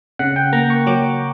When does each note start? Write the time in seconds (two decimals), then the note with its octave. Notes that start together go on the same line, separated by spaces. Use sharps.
0.19 C#3 F#5
0.36 G5
0.53 A#3 A#5
0.70 C#6
0.87 F#3 D6